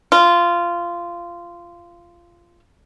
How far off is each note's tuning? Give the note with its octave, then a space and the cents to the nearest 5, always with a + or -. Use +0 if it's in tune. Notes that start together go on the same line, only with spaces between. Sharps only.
F4 -15